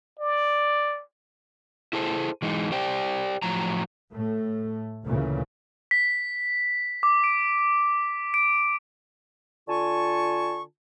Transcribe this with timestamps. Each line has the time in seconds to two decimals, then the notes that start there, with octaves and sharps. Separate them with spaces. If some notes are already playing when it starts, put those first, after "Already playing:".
0.19 D5
1.93 E4 G#4 A4 C5
2.42 E3 G#3 D#4
2.72 G4 C5 D5 G5
3.42 A2 F3 F#3 A#5
4.12 A2 A3
5.04 D2 A#2 C#3 E3
5.91 B6
7.03 D6
7.24 D7
7.58 D7
8.34 D7
9.68 D3 F4 G#5 A5 C#6